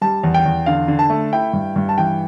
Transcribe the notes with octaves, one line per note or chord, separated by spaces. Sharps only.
G3 A5
E2
G5
E2
D3 F5
D3
A5
A3
E4 G5
G2
G2
A5
E3 G5